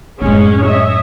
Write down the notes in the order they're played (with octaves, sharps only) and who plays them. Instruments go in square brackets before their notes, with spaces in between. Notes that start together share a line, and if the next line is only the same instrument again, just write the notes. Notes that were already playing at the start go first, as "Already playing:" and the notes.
[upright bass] F#2 A2 [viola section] G#3 C#4 G#4
[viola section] C#5 D#5 E5